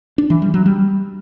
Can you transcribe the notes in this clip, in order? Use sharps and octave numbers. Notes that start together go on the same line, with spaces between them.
D4
E3
G3
F#3
G3